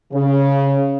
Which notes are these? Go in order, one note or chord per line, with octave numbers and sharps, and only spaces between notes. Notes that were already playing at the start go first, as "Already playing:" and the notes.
C#3